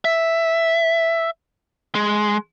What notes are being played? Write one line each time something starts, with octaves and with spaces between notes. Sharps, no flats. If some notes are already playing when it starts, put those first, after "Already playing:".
E5
G#3